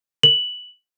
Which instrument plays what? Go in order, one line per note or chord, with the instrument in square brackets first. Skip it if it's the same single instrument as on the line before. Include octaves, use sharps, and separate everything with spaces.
[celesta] F#7